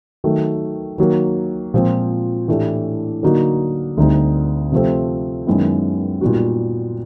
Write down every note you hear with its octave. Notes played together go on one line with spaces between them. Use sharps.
D#3 F#3 A3
D#3 F#3 A#3
A#2 F3 G#3 C4
A2 E3 A3 D4 G4
D3 F#3 A#3 D#4 F#4
D2 D3 G3 C4 D#4
C3 F3 A3 C4
F#2 D#3 G#3 B3 E4
A#2 G3 B3 D#4 F#4